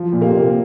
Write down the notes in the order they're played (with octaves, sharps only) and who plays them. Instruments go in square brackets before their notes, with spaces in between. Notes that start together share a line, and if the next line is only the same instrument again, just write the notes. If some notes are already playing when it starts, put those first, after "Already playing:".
Already playing: [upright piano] F3
[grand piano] A#2
[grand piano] C3 [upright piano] A#3